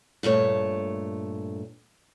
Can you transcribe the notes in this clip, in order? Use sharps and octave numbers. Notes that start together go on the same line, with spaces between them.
G2 A#2 A3 C#5